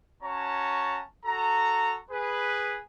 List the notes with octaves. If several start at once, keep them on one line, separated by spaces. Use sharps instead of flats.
C#4 F#4 C#5 A5 A#5
F#4 A4 A#5
G#4 B4